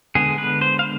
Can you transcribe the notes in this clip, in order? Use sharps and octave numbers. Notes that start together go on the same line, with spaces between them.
D3 G#3 B3 G#4
B4
C5
F5